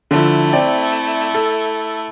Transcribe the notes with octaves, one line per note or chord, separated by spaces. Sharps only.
D3 F3 A3 E4
C4 D5
A4